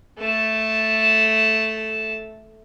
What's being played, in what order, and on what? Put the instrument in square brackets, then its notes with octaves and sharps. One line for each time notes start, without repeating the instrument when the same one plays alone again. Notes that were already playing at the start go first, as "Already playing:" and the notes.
[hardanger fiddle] A3 A5